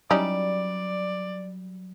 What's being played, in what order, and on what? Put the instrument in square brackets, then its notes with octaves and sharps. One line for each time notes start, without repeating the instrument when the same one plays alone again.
[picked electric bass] F#3 [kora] G3 [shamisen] C#4 D#4 E4 [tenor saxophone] D5